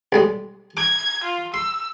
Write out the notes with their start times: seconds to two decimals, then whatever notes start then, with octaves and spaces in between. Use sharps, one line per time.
0.12 B1 G3 G#3
0.77 D6 G#6
1.24 F4
1.54 C6 E6